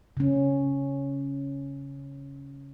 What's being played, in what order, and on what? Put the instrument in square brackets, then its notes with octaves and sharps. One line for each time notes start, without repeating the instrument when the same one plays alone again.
[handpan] C#3 C#4